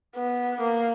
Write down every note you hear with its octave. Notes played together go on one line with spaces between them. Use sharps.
B3
A#3